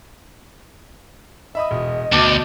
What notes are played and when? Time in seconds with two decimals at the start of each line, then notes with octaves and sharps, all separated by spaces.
1.55 D#5 E5 B5 D#6
1.71 E1
2.12 D2 B2 D4 D5 G5